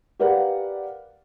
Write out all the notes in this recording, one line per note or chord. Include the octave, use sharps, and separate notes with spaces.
G4 A#4 B4 D5 F5 F#5